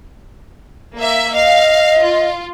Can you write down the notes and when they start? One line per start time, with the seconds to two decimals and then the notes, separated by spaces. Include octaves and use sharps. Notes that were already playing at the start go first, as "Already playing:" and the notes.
0.97 A#3 E5
1.33 D#5 F5
2.01 F4